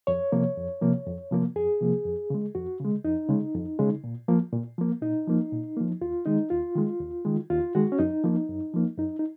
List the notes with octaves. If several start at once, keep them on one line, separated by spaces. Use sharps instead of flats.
F2 C#5
C3 F3 A#3
F2
C3 F3 A#3
F2
C3 F3 A#3
F2 G#4
C3 F3 A#3
F2
C#3 G#3
F2 F#4
C#3 G#3
F2 D#4
C#3 G#3
F2
C#3 G#3
A#2
F3 A#3
A#2
F3 A#3
A#2 D#4
F3 A#3
A#2
F3 A#3
D#2 F4
D#3 G#3 D#4
D#2 F4
D#3 G#3
D#2
D#3 G#3
D#2 F4
D#3 G#3 F#4
C#4
F#2 D#4
F3 A#3
F#2
F3 A#3
F#2 D#4
D#4